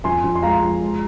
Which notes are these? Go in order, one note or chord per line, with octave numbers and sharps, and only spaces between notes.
F2 G#5 C6
F2
C6
G#3 F5 A#5
F3
G#3